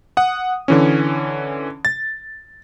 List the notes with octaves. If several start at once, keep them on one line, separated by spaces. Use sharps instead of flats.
F#5 D#6
D3 E3 C#4
A6